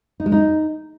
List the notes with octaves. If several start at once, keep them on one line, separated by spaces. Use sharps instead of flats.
D#4
G#3
D#4